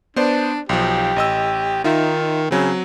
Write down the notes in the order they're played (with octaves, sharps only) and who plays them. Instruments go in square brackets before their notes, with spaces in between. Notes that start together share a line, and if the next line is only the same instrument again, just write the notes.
[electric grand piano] B3 C5 D5 [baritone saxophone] D4
[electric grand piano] B1 F3 [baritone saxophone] G4
[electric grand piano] A1 D#5 E6
[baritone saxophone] D#3 [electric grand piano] D#4 F4 E5
[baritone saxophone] C#3 [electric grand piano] F#3 C4